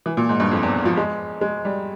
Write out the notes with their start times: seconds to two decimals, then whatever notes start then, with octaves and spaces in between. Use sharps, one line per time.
0.06 E3
0.17 A#2
0.29 G#2
0.40 G2
0.51 F2
0.63 E2
0.85 F3
0.97 G#3
1.41 G#3
1.65 G3